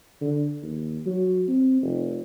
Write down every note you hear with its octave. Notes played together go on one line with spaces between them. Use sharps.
D3
D#2
F#3
C4
F1